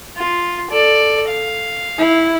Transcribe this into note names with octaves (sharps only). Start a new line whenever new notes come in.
F4
A4 D5
F5
E4